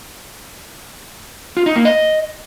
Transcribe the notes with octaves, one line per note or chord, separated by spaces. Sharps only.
F4
D#4
A#3
D#5